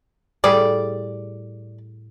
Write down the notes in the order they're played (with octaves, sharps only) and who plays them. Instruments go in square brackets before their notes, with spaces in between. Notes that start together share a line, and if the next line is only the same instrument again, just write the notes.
[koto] A2 G3 G#4 [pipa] D5